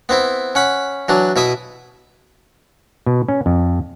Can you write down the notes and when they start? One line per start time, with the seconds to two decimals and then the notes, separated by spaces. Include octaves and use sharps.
0.09 B3 C4 E4
0.55 C#4 F#5 B5
1.08 E3 F#3 D4
1.36 B2 E4 E5 D#6
3.06 B2
3.28 C#4
3.46 F2